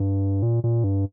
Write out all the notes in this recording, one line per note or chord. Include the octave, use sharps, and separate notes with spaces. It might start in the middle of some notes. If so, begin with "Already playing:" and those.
Already playing: G2
A#2
A#2
G2